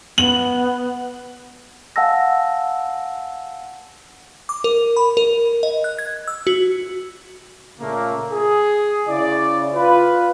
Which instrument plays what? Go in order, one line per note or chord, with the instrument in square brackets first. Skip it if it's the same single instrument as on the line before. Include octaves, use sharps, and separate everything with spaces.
[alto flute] B3 [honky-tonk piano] F#7
[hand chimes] F5 F#5 G#5 A5 E6 A#6
[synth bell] D6
A#4
B5
A#4
D#5
F#6
G#6
E6
F#4
[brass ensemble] A#2 C#3 A3 A#3
G#4
C#3 E4 D5
F4 B4